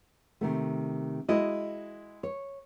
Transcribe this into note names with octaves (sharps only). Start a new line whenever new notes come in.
C3 D#3 A3
G#3 E4 F#4 D#5
C#5